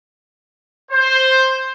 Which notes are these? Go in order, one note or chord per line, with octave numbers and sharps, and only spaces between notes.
C5